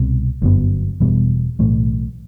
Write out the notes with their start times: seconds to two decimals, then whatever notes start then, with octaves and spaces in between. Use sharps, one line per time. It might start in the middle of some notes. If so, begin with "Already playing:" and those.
Already playing: C2 B2 G3 C4
0.42 G1 F#2 F#3 B3
1.00 E1 E2 B2 G3
1.59 B1 A2 E3 A3